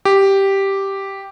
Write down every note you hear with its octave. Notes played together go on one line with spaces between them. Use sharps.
G4